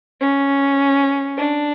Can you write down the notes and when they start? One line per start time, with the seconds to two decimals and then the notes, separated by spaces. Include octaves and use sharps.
0.21 C#4
1.37 D4